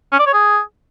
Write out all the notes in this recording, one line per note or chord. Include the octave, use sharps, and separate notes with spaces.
C#4
D5
C#5
G#4